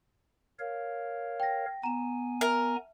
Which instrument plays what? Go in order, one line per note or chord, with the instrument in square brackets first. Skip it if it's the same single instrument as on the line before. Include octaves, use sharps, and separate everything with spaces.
[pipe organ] A#4 C#5 F5
[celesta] G5 A#6
[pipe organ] B3 G#5 [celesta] A#5 E7
[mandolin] A#4 [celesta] E5